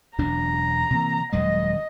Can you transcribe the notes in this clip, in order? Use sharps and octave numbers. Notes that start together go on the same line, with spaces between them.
E1 F#2 D4 A#5
C3 E3 A#3
D#1 F#2 G#3 D#5